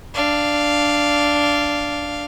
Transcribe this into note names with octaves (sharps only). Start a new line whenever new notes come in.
D4 F5